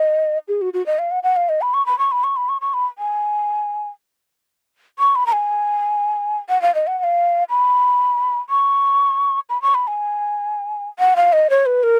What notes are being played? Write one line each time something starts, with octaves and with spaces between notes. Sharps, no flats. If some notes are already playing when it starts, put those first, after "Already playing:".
Already playing: D#5
G#4
F#4
F#4
D#5
F5
F#5
F#5
F5
D#5
B5
C#6
B5
C#6
B5
C#6
B5
C#6
C#6
B5
G#5
C#6
B5
A#5
G#5
F#5
F5
D#5
F#5
F#5
F5
B5
C#6
B5
C#6
B5
G#5
F#5
F5
D#5
C#5
B4
A#4